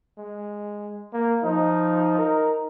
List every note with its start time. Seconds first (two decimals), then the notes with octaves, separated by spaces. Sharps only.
0.18 G#3
1.13 A#3
1.44 F3 D#4
2.18 A#4